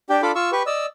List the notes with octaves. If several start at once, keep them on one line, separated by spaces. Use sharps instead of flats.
D4 G4 G5
D4 F4 A4 D5 B5 D6
F4 C#6 E6
G4 B4 C#6
D5 D#5 E6